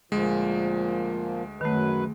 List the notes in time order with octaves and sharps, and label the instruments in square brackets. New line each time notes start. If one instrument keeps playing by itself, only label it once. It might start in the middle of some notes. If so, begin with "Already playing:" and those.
[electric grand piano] D2 G#3 [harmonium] A#2 F3
[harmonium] F#2 F#3 B4 [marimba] D#3 A3